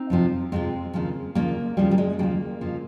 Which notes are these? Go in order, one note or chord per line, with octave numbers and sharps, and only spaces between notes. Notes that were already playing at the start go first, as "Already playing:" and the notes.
Already playing: C4 D#4
F2 C3 F3
F2 C3 F3 G#3 C4
D#2 C#3 F3
D#2 C#3 F3 G3 A#3
D#2 C#3 F3 G3
G3
G#3
D#2 C#3 F3 G3 A#3
F2 C#3 F3